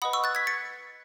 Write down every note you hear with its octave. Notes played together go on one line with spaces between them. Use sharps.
B4 D#5 F#5 B5 D#6
C#6 E6
F#6 A6
G#6 B6
A6 C#7